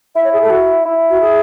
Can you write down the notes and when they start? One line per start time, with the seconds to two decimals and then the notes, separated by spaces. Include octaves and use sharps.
0.15 E4 E5
0.24 C#5
0.33 G#4
0.42 A4
0.50 F#4
0.85 E4
1.10 F#4
1.21 G#4